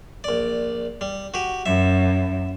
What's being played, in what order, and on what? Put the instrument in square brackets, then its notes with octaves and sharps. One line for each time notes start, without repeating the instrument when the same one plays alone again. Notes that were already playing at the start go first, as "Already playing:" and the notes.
[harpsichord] A#1 D5
G3
F#4 G4
[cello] F#2 [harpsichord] E5